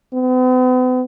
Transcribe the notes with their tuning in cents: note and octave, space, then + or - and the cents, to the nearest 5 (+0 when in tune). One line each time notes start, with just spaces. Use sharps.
B3 +45